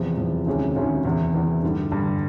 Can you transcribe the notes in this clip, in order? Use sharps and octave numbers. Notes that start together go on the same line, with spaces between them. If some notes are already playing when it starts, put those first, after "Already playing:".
Already playing: E2 C3 F3
E2 C3 F3
D2 C3 D#3 G#3 C#4
D2 C3 D#3 G#3 C#4
E2 C3 E3
E2 C3 E3
G2 D3 G3
G2 D3 G3